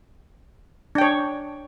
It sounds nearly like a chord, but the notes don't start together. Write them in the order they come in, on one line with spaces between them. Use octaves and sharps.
D4 G5 C#5